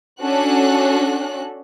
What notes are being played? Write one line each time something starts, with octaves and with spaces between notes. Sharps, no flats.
C#4 D4 F#4 A4 F#6